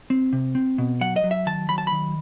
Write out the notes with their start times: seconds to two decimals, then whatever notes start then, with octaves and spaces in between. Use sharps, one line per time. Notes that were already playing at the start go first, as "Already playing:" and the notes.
0.10 C4
0.33 C3
0.55 C4
0.78 B2
1.01 F#3 F#5
1.16 D#5
1.24 F#3
1.31 E5
1.46 D#3 A5
1.69 F#3 B5
1.78 A5
1.87 D#3 B5